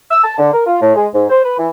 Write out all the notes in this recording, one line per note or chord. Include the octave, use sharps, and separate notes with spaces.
E6
A5
D3
A#4
F4
A2
G#3
G#2
C5
B4
E3